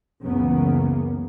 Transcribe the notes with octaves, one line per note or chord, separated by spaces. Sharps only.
F#1 C#2 C#3 E3 A#3 B3